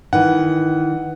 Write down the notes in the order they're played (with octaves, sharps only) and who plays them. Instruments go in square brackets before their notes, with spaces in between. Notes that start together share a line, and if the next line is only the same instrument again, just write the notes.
[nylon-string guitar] D#3 E3 [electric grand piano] F#5